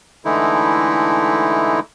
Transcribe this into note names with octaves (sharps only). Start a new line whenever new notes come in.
D3 E3 G#3 A3 D#4 E4